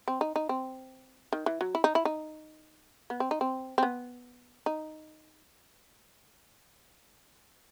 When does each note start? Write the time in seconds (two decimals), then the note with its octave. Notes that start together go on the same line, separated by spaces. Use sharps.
0.08 C4
0.21 D#4
0.36 D#4
0.49 C4
1.33 D#3
1.46 E3
1.61 F#3
1.75 E4
1.84 D#4
1.95 E4
2.05 D#4
3.10 B3
3.20 C4
3.31 D#4
3.41 C4
3.78 C4
3.83 B3
4.66 D#4